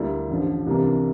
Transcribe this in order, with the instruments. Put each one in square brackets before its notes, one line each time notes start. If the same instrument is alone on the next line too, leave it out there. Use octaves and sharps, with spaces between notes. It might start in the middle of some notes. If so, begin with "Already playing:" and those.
Already playing: [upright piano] D2 D3 G3 A#3 E4
A1 G2 D3 F3
C2 C3 E3 A#3 D4